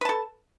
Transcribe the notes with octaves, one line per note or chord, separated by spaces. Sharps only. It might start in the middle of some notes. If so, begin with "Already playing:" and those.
A4 B4 A5